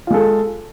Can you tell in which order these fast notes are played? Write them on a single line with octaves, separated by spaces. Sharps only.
F4 G#3 A4